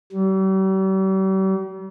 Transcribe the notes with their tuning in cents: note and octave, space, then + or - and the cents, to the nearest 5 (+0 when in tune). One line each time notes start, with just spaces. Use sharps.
G3 -45